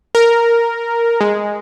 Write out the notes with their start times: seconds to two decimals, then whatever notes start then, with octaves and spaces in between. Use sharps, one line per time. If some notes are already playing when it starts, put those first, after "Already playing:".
0.15 A#4
1.21 G#3